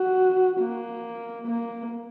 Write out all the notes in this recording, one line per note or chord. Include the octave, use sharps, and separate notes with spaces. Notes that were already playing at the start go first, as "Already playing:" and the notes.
Already playing: F#4
A#3
A#3